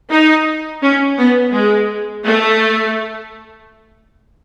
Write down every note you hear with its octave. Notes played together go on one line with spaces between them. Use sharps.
D#4
C#4
B3
G#3
A3